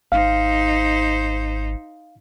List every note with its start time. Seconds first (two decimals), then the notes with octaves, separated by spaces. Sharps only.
0.12 G#1 D#4 C5 F5